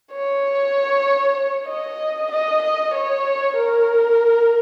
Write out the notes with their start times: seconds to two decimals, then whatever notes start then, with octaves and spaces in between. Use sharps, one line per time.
0.12 C#5
1.68 D#5
2.32 D#5
2.62 D#5
2.94 C#5
3.56 A#4